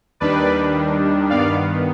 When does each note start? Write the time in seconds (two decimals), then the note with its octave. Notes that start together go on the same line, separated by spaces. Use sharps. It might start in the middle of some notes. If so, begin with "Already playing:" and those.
0.20 D#2 D#3 G3 D4 B4 D5
1.30 G2 D#3 B3 D5 F5